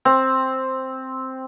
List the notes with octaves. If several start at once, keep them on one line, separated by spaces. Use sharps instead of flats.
C4